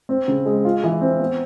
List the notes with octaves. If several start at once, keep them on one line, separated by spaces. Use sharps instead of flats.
C4
C#3
G#3
F4
E3
C4
B3